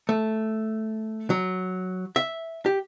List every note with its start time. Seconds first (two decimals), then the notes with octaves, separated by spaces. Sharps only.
0.09 A3
1.30 F#3
2.16 E5
2.66 G4